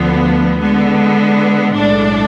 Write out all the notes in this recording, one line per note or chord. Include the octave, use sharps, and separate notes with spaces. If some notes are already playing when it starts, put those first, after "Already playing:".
Already playing: D2 D3 F3 B3
D3 G#3 B3
B1 A2 G#3 D4 A4